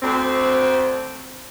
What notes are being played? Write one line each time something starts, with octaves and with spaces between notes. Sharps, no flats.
D2 C4